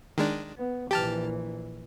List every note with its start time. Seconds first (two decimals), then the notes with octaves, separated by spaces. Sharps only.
0.18 D#3 G#3 D4
0.57 B3
0.91 A#1 E3 G4 A5 F6